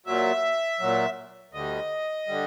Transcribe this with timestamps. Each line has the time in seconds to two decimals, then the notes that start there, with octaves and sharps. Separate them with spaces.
0.06 A#2 F#3 E5
0.80 A#2 F#3
1.53 D2 D3 G3 D#5
2.27 D3 G3